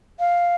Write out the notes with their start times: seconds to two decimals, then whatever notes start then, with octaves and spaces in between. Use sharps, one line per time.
0.20 F5